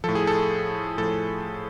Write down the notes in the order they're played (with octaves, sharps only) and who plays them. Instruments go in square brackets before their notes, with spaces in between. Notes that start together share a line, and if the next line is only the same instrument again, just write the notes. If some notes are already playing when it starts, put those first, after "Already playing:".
[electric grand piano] A2 F3 A4
G#4
A4
A2 F3 A4